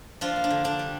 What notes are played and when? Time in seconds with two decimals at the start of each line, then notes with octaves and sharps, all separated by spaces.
0.21 F3 D4 F4
0.36 A#3
0.44 D4
0.50 D3
0.64 D3 D4
0.79 G3